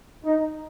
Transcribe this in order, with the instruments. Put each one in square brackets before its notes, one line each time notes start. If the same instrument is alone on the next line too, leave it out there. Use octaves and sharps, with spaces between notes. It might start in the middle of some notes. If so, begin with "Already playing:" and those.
[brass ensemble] D#4